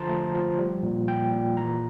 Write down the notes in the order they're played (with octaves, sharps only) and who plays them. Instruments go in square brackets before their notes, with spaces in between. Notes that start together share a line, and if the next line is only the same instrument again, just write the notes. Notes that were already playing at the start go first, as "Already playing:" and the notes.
Already playing: [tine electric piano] D3 F3 A5 A#5 C6
A3
F3
G3
A#2
A#2 G5
A#2
E3 A#5